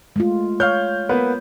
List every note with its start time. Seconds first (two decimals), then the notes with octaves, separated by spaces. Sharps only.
0.16 G#3 A3 F4
0.60 C#5 F5 F6 G6
1.09 A#3 B3 B4